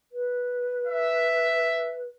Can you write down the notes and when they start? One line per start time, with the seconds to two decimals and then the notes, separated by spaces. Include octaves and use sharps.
0.12 B4
0.87 E5